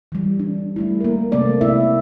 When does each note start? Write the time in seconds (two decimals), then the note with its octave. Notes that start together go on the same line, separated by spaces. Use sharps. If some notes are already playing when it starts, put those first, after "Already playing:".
0.12 E3 G3
0.39 D4
0.76 G3 A3 E4
1.01 A#3 A#4
1.32 C3 F#3 A3 A#3 C4 D5
1.61 C3 B3 E4 E5